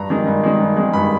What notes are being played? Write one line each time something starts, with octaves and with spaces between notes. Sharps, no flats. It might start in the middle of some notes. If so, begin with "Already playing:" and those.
Already playing: G2 A#5
D#3 G#3
G2
D#3 G#3
G2
D#3 G#3
G2 B5